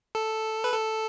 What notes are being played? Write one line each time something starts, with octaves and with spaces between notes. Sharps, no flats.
A4
B4
A4